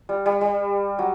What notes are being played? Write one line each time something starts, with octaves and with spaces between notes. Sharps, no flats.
G3
G3
G3
F#3